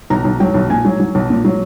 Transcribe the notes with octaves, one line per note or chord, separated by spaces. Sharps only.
B1 A#5
B1
F#3 G5
B1
A#2 G#5
F#3
F#3
B1
A#2
F#3